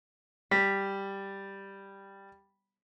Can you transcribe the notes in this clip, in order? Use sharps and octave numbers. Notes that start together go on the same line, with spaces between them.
G3 B6